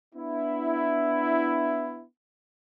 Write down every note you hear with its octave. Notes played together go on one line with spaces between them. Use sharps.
B3 D4 E4